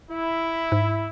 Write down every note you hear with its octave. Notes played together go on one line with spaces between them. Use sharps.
E4
G#2